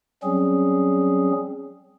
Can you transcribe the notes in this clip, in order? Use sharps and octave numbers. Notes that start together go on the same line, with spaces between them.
F#3 G3 C4 C#4 G#4